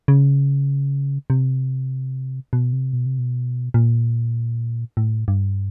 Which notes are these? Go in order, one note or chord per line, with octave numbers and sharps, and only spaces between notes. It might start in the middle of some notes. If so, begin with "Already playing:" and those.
C#3
C3
B2
C3
B2
C3
B2
A#2
A2
G2